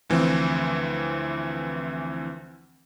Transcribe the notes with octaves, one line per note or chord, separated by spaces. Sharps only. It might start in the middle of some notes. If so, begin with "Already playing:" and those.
D2 E3 F3 C4